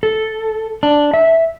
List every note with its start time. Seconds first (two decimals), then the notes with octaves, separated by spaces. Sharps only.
0.03 A4
0.83 D4
1.14 E5